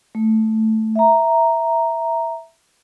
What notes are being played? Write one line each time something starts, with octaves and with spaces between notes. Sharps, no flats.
A3
E5 A#5